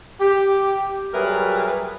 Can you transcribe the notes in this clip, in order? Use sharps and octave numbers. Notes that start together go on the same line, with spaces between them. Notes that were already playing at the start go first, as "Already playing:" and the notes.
G4
F#3 G3 G#4 A#4 B4 E5